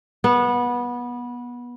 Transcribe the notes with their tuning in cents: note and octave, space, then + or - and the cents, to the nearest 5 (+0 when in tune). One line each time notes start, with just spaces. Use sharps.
B3 -20